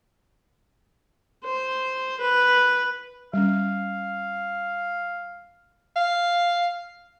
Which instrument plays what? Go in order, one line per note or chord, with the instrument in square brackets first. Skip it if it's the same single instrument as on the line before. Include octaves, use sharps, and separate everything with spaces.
[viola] C5
B4
[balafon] G3 C#4 [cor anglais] F5
[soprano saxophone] F5